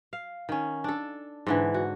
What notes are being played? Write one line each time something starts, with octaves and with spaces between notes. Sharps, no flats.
F5
D#3 C#4
D4 A4
G#2 D3 E3
F#4